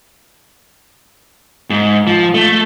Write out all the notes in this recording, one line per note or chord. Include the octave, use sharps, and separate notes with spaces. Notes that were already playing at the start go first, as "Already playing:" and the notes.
G#2
F3
A3